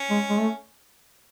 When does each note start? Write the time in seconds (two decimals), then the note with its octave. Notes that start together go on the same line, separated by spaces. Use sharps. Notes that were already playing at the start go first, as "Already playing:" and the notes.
Already playing: C#4
0.10 G#3
0.30 G#3
0.39 A3